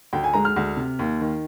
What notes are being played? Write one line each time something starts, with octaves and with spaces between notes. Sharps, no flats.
D2 G5
G#5
G#3 A#5
F6
D2
C3
D#2
D#3